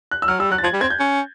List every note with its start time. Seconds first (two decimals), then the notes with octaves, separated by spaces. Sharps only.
0.11 F#6
0.22 E6
0.28 F#3 F6
0.40 G3 E6
0.51 F#3 F#6
0.58 A6
0.63 F3 G#6
0.73 G3
0.81 C4 G#6
0.90 G6
0.99 C#4